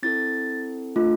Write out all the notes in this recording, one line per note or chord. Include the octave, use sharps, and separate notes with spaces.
C4 E4 A4 A6
A3 D4 F4